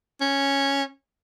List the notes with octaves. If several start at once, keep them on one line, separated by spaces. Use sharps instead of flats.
C#4